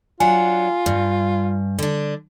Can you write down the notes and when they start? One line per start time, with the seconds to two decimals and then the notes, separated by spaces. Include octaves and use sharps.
0.20 F#3 D4 F4 F#5 G#5
0.86 G2
1.79 D3 D4